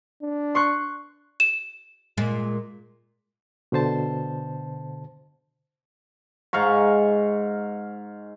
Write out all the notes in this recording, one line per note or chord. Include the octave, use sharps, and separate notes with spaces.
D4
C6 C#6 F#6
E7
A#2 G#3
B2 D3 C5 A5
G#2 F5 A#5 C#6